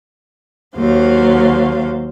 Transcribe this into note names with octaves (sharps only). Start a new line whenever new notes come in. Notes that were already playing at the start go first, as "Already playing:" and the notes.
D#2 F#3 C5 F5